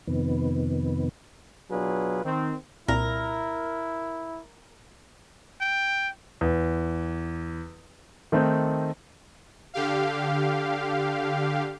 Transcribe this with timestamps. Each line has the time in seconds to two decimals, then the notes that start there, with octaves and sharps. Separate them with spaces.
0.07 F2 C3 D#3 B3
1.70 B2 F#3 D4 F4 G#4 B4
2.24 D#3 C4
2.88 C2 A#2 E4 A#4
5.61 G5
6.41 E2
8.32 D#3 A3 C4 D#4
9.74 D3 G4 F5